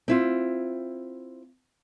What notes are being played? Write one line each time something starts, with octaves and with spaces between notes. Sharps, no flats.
C4 E4 F4